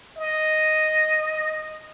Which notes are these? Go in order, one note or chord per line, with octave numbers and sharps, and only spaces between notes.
D#5